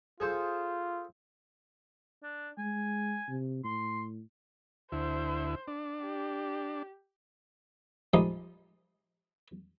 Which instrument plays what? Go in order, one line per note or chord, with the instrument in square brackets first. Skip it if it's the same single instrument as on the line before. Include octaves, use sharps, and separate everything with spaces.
[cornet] F4 [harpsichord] G#4 A4 C5
[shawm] D4
[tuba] G#3 [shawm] G#5
[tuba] C3
[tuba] A2 [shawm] C6
[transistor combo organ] D2 E4 [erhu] C5
[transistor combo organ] D4
[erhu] G4
[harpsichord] F3 G3 G#3 D#4